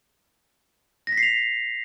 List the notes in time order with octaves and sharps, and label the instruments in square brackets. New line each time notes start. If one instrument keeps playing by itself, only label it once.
[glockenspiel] A#6
B6
C7
F7